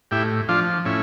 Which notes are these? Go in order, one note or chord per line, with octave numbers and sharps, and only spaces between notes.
A2 E4 G4
F3 D4 F4
A2 C#4 E4